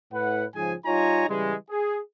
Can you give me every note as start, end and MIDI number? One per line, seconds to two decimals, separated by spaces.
0.12 0.44 45
0.12 0.44 71
0.12 0.44 78
0.55 0.74 44
0.55 0.74 49
0.55 0.74 53
0.55 0.74 68
0.55 0.74 80
0.86 1.29 55
0.86 1.29 63
0.86 1.29 65
0.86 1.29 73
0.86 1.29 80
0.86 1.29 82
1.29 1.55 49
1.29 1.55 52
1.29 1.55 55
1.29 1.55 56
1.70 1.99 68